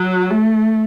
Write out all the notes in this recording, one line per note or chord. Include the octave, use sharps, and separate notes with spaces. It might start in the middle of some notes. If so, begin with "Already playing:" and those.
Already playing: F#3
A3